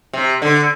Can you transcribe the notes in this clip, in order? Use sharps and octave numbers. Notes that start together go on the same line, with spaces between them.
C3
D3